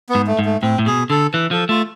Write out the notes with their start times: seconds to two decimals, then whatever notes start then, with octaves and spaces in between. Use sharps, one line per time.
0.09 B3
0.15 G#2
0.27 A3
0.39 G#2
0.45 A3
0.62 A2 C4
0.79 A2
0.86 B2 G#4
1.10 D3 A4
1.33 E3 B4
1.51 F3 A4
1.69 A3 F4